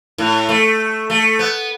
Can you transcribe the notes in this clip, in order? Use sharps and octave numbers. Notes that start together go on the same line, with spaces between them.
A2
A3
A3
B3